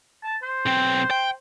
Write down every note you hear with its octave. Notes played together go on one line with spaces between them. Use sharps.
A5
C5
B1 C4
G5